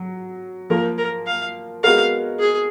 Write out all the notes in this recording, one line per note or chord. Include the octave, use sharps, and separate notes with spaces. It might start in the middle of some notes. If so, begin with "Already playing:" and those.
Already playing: F#3
F3 A#3 F4 A#4
A#4
F5
G#3 B3 F#4 A#4 F5
G#4